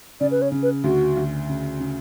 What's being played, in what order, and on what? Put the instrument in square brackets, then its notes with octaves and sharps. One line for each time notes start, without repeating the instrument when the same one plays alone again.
[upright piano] C#3 [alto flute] D5
[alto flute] B4
C#5
[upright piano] C#3
[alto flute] B4
[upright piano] D2 [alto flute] F#4
[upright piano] D2
C#3
C#3